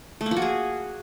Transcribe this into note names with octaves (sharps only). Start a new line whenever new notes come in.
A3
A#3
F3
F#4
G#4